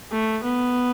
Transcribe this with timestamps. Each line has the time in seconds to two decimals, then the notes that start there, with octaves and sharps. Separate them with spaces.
0.11 A3
0.43 B3